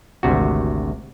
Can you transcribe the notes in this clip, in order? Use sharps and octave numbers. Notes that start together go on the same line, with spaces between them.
G#1 D2 C3 F#4